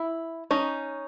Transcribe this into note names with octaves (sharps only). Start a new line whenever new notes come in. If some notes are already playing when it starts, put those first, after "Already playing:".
Already playing: E4
C#4 D#4